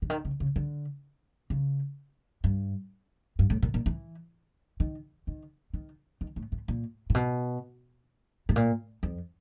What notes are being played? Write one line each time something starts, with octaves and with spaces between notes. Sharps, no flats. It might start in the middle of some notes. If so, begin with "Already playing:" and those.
D3
D#3
C#3
C#3
D3
C#3
G2
G2
A2
A#2
A#2
E3
D#3
D#3
D#3
D#3
A2
A2
A#2
A#2
B2
A2
A#2
F2